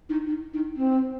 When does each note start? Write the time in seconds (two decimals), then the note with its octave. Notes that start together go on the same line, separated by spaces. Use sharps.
0.09 D#4
0.26 D#4
0.54 D#4
0.76 C4